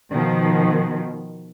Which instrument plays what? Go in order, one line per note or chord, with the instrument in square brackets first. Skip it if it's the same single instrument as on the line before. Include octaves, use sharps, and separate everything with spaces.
[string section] B2 D#3 F3